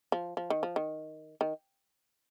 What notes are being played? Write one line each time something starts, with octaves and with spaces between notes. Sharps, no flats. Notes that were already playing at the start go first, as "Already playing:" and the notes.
F3
F3
D#3
F3
D#3
D#3